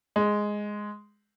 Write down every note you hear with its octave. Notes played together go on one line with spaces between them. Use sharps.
G#3